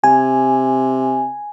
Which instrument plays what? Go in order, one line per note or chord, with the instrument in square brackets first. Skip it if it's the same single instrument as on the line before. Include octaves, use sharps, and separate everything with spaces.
[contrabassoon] C3 [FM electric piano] G#5